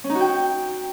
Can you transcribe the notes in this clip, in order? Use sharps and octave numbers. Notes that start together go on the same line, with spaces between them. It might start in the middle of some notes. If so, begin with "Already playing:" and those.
C#4
D#4
F#4
G5